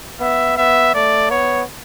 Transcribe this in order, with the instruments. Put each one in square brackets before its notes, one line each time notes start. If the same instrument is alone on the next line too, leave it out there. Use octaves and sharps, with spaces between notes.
[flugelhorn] B3 [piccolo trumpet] E5
[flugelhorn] B3 [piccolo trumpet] E5
[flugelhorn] A3 [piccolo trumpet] D5
[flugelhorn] B3 [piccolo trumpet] C#5